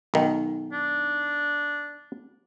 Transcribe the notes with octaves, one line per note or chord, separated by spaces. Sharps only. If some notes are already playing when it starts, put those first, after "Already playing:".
B1 D#3
D4